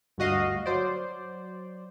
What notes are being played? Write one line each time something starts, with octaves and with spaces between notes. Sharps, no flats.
G1 D2 F#4 D#5 F5
F#3 C5 D5